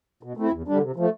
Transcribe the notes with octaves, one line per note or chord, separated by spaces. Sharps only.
B2
A3 C4 E4
E2
D3 G3 D4
C3
F3 A3